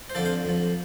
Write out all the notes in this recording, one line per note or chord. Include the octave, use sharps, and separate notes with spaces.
C5
F2 D3 F3 A4 D5
C5 F5
F2 F3